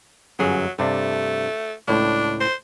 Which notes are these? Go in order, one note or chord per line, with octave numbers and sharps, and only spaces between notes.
G1 F#2 F#3 G#4
G2 C3 A3 D4
C#2 A2 D4
C5